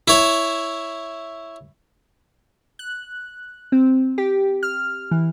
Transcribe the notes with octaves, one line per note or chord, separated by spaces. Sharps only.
E4 C#5
F#6
C4
G4
F6
E3